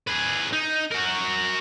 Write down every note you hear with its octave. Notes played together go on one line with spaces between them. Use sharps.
G#4 B4
D#4
F#4 A#4